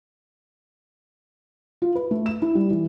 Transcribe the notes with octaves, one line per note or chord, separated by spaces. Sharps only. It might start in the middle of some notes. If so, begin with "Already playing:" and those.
F4
B4
A3
E7
E4
G3
E3